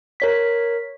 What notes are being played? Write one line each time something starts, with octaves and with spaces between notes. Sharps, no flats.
A#4 C#5 B6